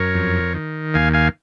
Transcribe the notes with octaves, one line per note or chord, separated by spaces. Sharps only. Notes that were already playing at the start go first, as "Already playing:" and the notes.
Already playing: F#2 A#4 C#5
F2
D#3
D#2 F5 G#5
F5 G#5